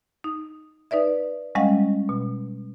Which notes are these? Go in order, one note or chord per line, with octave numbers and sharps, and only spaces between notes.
D#4
D#4 B4 D5 E5
G3 G#3 C#4 D#5 F5 F#5
B2